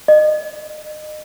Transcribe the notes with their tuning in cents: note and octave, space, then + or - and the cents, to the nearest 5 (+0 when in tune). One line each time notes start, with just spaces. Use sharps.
D#5 -35